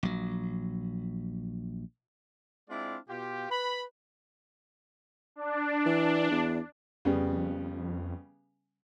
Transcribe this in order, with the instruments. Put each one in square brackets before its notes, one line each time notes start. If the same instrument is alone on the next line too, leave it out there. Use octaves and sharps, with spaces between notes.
[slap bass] A#1 F#3
[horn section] G#3 C4 D4 E4 F4 D5
B2 F4 G4
B4 B5
[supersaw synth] D4
[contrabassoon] E3
E2
[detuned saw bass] F2 [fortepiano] C#3 G3 B3